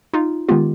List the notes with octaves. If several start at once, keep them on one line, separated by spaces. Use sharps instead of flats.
D#4 F4
D#3 G#3 B3 F4 G4